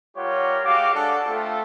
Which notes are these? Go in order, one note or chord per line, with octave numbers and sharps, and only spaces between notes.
G3 F4 G4 A#4 C#5 F#5
G#3 F#4 G4 F5 D6
D4 A4 F#5
A3 C4 F4 A4